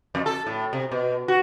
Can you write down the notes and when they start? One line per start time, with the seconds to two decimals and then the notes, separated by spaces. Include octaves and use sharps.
0.15 F2
0.26 A4
0.47 A2
0.73 C3
0.92 B2
1.28 F#4